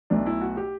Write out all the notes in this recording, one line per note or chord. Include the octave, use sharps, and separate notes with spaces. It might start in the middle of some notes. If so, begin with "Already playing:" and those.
B1 B2 A3 D4
E4
F#4
G4